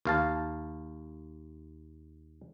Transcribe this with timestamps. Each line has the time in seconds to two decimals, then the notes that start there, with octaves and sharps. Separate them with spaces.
0.05 D#2 F5 A5